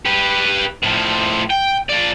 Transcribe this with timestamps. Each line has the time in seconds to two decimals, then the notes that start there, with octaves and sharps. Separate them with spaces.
0.05 G4 B4
0.84 A2 F3
1.50 G5
1.90 F3 D5